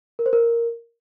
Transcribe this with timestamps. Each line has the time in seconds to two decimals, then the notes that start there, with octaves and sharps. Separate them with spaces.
0.19 A#4
0.26 C5
0.33 A#4